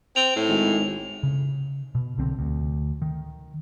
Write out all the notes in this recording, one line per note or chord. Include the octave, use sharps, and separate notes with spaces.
C4 F7
A2
G#1
C#3
B2
C2 D3 C4
D2
D#3